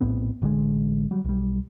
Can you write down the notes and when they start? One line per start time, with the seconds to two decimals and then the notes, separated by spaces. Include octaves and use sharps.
0.01 A#1 A2 B3 C4
0.42 A1 D3 E3 G#3
1.11 F#3 G3
1.25 B1 G3